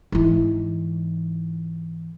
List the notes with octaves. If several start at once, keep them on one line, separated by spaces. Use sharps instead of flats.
G#2 E3